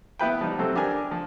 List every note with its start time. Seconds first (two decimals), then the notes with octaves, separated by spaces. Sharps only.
0.19 B3 E4 B4 G5
0.41 F3 G3 D#4
0.58 C3 F#3 C4 A4
0.75 D4 G4 A#4 G#5
1.11 F3